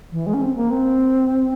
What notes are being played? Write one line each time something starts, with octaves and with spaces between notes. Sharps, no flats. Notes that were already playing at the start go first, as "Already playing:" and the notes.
E3
G#3
C#4
C4
A#3
C4